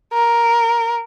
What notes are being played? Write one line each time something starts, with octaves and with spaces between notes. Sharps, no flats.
A#4